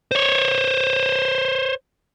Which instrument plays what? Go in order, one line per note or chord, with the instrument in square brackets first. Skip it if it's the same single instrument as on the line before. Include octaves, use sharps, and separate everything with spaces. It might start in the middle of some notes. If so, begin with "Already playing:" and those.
[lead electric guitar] C5 C#5